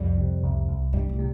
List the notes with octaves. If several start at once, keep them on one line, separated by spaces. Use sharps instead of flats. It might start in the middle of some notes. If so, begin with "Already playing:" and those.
Already playing: C2 F2 G3
C3
C2
C2
G2 G3
A2
C3